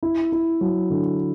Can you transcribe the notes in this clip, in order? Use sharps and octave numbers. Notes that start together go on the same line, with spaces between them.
E4
E4
F#3
D3